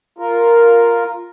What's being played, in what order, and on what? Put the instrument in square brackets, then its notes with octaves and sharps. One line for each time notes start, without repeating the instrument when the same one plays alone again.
[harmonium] F4 A#4